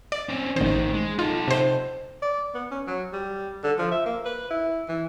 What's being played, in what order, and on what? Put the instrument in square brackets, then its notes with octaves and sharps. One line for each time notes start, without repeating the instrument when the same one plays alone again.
[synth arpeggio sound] D5
[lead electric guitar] C4 C#4
[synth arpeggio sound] A1 C5 [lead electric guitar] D2 D#3
[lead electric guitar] G#3
[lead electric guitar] D#4 A4 [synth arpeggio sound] F4
[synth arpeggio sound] C3 C5
[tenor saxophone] D5
B3
C#4
F#3
G3
D3
F3
E5
A#3
B4
E4
E3